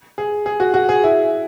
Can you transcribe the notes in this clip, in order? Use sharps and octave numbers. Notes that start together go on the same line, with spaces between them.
G#4
G#4
F#4
F#4
G#4
E4